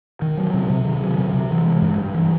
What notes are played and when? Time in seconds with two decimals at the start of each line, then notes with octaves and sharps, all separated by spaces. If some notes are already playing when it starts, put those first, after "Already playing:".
0.22 D#3
0.37 F#3
0.54 C3
0.70 C3
0.85 D#3
1.02 F#3
1.18 C3
1.34 C3
1.50 E3
1.66 G#3
1.82 G2
1.98 G2
2.14 E3